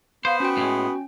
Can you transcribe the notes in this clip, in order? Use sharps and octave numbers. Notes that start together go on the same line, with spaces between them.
B3 C5 F5
C#4 F#4 G5
A2 G#3